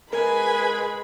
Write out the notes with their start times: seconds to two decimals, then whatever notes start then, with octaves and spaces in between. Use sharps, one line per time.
0.13 G#3 A#4 B4 G#5 B5